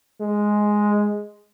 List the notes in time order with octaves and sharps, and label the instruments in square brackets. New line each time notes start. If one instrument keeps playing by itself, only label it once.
[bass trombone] G#3